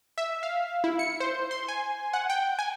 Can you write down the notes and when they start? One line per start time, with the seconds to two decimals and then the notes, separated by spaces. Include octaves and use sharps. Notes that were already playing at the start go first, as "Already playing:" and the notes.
0.18 E5
0.43 F5
0.84 E4
0.99 C#7
1.20 C5
1.51 C6
1.68 G#5
2.13 F#5
2.30 G5
2.59 G#5